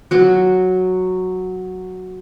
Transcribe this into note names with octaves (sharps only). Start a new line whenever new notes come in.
F#3 F#4